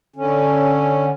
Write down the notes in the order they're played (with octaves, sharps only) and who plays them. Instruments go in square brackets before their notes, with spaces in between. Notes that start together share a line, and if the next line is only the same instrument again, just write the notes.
[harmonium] D3 C#4